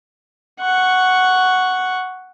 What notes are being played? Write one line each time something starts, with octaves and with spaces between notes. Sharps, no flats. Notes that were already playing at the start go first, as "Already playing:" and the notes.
F#5 C#6